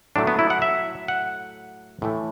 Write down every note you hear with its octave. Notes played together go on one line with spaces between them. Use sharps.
A2 F#3 A3 D4
B3
E4
F#5
E5
F#5
A2 E3 A3